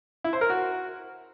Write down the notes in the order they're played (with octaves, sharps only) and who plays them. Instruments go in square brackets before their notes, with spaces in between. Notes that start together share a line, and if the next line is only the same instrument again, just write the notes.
[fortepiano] E4
C5
A#4
F#4